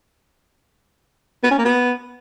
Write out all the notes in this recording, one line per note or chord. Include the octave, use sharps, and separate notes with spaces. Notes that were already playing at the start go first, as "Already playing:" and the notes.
B3
C#4
A#3
B3